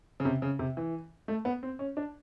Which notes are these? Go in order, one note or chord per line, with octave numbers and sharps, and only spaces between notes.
C#3
C3
C#3
C3
E3
A3
B3
C4
C#4
D4